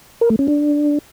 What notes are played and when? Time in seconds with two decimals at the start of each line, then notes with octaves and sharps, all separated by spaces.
0.21 A#4
0.30 A3
0.39 C#4
0.48 D4